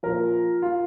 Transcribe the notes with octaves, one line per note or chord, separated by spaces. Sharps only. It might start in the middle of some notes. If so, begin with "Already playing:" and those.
A#2 F3 A#4
F4